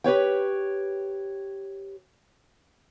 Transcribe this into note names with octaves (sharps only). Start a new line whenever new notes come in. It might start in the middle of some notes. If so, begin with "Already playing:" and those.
G4 B4 C#5 G5